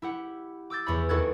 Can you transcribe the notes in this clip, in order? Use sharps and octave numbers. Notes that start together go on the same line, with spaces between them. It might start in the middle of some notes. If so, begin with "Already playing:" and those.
E4 G4 F#5
D6 E6 G6 A6
E2 C#5 B5
D#2 E4 F#4 A4 F#6 G#6